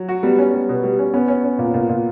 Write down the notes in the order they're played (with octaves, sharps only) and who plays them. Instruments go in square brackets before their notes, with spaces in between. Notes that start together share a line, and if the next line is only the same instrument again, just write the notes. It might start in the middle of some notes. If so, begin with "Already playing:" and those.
Already playing: [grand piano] F#3
[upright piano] F#4
[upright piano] G3 [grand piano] B3
[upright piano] C#4
G3
B2
G3
C#4
[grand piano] B3 [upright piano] C#4
[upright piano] C#4
C#4
[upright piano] A#2 [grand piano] A#3
[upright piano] A#2
A#2